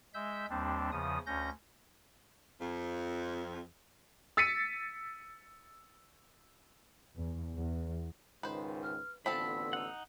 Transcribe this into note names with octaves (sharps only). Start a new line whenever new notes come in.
G#3 E5 E6 G6
D#2 G3 C4 D4
E2 C#3 F3 D#6
D2 C#4 G6 A#6
F2
E6 A6 B6 C#7 D#7
E2
E2
C#2 G#2 D#3 B4 C5
F6
A1 D3 F3 B3 C4 A4 B5 E6
D#4 F#5